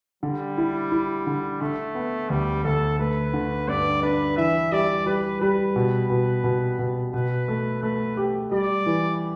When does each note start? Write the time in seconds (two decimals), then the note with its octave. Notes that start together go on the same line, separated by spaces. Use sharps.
0.23 D3 G3
0.58 E4
0.92 E4
1.27 D3
1.61 D3 A3
1.95 B3
2.30 D2 G3
2.64 D2 A4
2.99 A3 B4
3.34 D3
3.68 G2 D5
4.03 D4 B4
4.37 E3 E5
4.72 G3 D5
5.06 G3 B4
5.41 G3 B4
5.76 B2
6.10 B2
6.44 B2
6.79 B2
7.14 B2 B4
7.48 A3
7.83 A3 B4
8.17 G4
8.51 G3 D5
8.86 E3